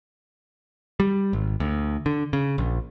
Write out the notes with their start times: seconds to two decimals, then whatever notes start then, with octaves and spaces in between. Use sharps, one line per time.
1.00 G3
1.33 G#1
1.60 D2
2.06 D3
2.33 C#3
2.58 A#1